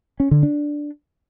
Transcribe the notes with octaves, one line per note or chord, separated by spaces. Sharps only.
C#4
D3
D4